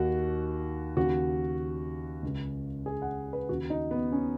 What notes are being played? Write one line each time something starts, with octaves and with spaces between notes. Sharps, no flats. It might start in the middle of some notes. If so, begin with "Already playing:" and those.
Already playing: D#2 D#3 F#4
D#2 C#3 F#4
C#2 C#3
G#4
F#5
B4
D#2 C#3 F#4
D#4
B3
C#4